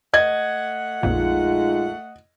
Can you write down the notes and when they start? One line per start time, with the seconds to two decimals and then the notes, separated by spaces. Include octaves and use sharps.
0.13 A3 D#5 F#5 G#6
1.03 A#1 F2 A#2 G#3 D#4 F4